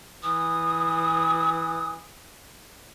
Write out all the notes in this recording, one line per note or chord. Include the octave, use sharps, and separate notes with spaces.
E3 D#6